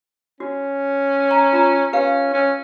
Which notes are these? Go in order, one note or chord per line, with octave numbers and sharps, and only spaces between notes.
C#4 F#4
A#5
F4 A#5
C#4 G4 B4 F5
C#4